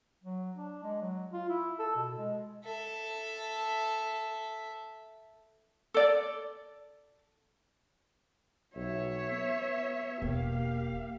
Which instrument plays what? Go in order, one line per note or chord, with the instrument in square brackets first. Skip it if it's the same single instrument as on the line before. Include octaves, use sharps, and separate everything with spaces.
[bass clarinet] F#3
D4
G#3
F#3
F4
E4
A4
B2
G#3
[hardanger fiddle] A4 E5
[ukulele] A4 D5
[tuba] B1 [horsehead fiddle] C#5 E5
[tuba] B3
[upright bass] E1 [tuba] A#3 [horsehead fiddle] G4 F5